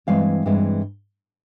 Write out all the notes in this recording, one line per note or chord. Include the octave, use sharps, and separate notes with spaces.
G2 E3 G#3 C4 E4 F5
G2 E3 G#3 C4 E4